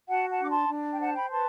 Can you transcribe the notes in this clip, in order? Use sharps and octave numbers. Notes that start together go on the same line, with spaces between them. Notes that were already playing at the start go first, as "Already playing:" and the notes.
F#4 F#5 A5
F#5 A5
D4 D6
A5 C6
D4
G5
C5 F#5 A5
G5 B5
B4 A5 C6